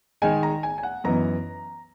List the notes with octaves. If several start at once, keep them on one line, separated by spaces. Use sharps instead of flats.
D#3 G#3 D#4 G#5
A#5
G#5
G#5
F#5
F#2 E3 B3 D#4 A#5